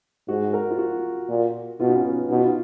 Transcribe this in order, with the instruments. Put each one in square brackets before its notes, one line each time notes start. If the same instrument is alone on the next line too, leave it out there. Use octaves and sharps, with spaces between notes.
[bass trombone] G#2 [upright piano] F#4
[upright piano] A#4
F4
F#4
[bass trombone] A#2
[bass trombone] B2 [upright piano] F4
[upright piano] D#4
C#4
B3
[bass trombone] B2 [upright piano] D#4
[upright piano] F4
D#4